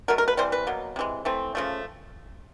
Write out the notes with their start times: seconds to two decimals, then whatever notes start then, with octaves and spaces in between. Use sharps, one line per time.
0.08 B2 F#3 A3 A#4
0.18 A#4
0.28 B4
0.37 C3 E3 G3 C5
0.52 B4
0.67 B2 F#3 A#3
0.96 C3 E3 G#3
1.25 E3 A3 C4
1.55 C#3 F3 A3